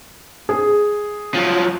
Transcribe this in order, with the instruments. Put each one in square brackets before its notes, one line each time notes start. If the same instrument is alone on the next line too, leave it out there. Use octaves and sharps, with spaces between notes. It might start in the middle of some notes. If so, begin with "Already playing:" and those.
[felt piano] G#4
[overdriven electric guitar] F3 F#3